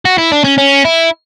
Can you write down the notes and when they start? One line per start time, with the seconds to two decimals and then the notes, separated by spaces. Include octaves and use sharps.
0.05 F#4
0.18 E4
0.32 D4
0.44 C#4
0.58 C#4
0.84 E4